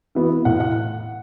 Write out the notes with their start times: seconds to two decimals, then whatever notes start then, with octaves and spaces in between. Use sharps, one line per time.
0.15 E3 B3 F#4
0.45 A2 F#5
0.60 F#5